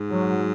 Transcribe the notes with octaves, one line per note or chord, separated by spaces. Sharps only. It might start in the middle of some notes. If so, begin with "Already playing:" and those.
Already playing: G#2
F#3